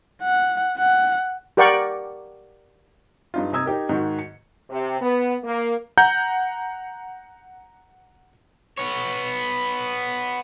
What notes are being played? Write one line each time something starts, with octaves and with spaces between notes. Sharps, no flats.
F#5
F#5
G4 A#4 D5 F#5 G5 C#6
G2 D#4 F4
C3 D#4 A#5 D#6 E6 G#6
D#4 G4 A#4
G#2 D#3 F#4
C#7
C3
B3
A#3
F#5 A#5 G6
B3 C#5